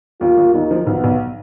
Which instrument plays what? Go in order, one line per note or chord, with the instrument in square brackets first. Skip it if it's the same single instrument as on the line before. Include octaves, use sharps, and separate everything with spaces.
[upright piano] D#2 [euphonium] F4
[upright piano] D#2
[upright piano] D#2 [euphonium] D#4
[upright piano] F3
[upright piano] B1 [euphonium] B3
[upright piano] B1